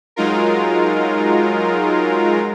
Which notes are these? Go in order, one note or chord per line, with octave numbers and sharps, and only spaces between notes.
F#3 G#3 D#4 F4 A#4